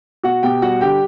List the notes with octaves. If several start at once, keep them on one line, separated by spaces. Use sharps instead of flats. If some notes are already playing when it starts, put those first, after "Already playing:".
B2 F#4 F#5
B2 G4 G5
G3 F#4 F#5
D3 G4 G5